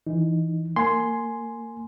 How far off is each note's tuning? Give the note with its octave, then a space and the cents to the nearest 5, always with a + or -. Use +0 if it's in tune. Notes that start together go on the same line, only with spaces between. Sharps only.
E3 +0 D#4 +0
A#3 -25 G#5 +10 C6 +0